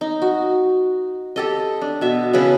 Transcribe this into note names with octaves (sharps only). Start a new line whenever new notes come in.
D#4
F#4
G4 A4 D#5
D4
B2 E5
C#3 E4 B4 A5